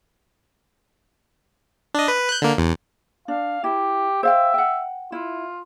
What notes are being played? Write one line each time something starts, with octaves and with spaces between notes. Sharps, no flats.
D4 D#5
B4
F#6 G6
D3 A#3
E2
D4 F5
E4 G4
C5 E5 F5 G5
F#5 G5
E4 F4